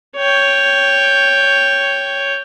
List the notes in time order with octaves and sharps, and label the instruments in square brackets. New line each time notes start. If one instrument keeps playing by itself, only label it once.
[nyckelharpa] C#5 G5